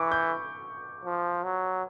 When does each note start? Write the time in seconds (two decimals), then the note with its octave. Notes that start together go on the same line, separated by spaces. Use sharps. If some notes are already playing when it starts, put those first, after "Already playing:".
Already playing: E3 C#6 D6
0.12 G6
1.05 F3
1.44 F#3